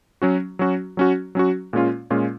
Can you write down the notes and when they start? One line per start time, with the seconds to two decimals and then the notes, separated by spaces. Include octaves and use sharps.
0.22 F#3 C#4 F#4
0.59 F#3 C#4 F#4
0.97 F#3 C#4 F#4
1.35 F#3 C#4 F#4
1.73 A#2 G#3 C#4 F4
2.10 A#2 G#3 C#4 F4